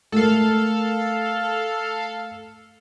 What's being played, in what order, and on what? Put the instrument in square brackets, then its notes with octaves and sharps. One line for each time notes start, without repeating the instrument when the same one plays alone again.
[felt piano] A3 A#4 [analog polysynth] A4 F5